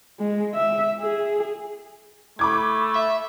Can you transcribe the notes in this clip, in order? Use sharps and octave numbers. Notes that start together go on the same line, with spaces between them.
G#3
E5
G#4
A3 B5 D6 G#6
E5